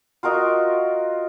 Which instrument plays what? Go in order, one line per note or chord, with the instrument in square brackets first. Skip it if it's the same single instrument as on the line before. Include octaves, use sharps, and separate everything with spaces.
[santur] F4 F#4 A#4 D#5